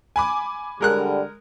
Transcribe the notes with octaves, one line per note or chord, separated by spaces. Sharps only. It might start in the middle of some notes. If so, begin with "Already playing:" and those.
G#5 B5 D6
D3 G3 G#3 A#4 F#6